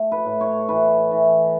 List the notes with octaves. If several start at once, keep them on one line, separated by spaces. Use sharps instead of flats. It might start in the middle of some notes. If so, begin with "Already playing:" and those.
Already playing: A3
B4
A2
C#5
E3 B4
E3